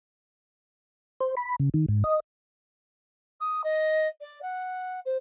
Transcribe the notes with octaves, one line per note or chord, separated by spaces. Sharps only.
C5
B5
C#3
D#3
G#2
D#5
D#6
D#5
D5
F#5
C5